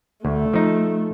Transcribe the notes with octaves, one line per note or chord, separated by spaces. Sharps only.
D2 A3
F3 D#4